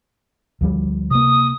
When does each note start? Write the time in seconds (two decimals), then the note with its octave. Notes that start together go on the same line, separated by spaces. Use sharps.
0.61 D2 F3 G3
1.11 C3 A#3 D#6